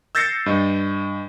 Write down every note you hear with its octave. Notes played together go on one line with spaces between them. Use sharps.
E6 G6 A6 A#6 C7 C#7
G2 D#5